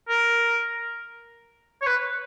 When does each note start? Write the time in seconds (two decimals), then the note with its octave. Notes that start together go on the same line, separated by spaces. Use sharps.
0.09 A#4
1.82 C#5
1.87 B4